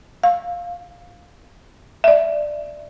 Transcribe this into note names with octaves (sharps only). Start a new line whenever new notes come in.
F5
D5 E5